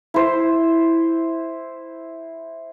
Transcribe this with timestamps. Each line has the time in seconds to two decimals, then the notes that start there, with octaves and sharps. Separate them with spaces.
0.14 E4 C5